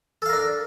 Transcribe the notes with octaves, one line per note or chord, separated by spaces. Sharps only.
D4 A4 A#4 F5